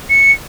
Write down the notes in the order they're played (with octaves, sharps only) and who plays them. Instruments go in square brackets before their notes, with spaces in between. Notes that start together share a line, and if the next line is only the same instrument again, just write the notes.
[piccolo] C#7